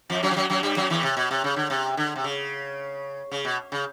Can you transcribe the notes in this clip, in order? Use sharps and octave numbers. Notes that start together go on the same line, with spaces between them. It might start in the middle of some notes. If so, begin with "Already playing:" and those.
F2 F3
F#2 F#3
F3
F#2 F#3
F#2 F#3
G2 G3
F#2 F#3
E2 E3
C3
B2
C3
C#3
D3
C3
D3
C3
C#3
C#3
B2
C#3